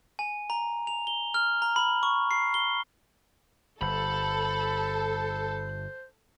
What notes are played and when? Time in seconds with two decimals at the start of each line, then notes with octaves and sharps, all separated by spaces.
0.19 G#5
0.50 A#5
0.87 F7
1.07 G7
1.34 F6
1.62 A#5
1.76 B5
2.03 C#6
2.31 C7
2.54 G7
3.81 G1 A4 C5 B5